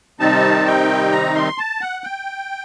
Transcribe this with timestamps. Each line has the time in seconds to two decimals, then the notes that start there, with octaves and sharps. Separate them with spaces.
0.20 C3 D#3 G3 C4 D#4 A5
0.66 G5
1.12 A#5
1.35 C6
1.58 A5
1.81 F#5
2.04 G5